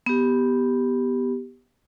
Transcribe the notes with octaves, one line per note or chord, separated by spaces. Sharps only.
B3 G4